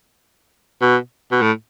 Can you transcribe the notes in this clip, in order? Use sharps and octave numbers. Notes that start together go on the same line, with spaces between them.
B2
B2
A2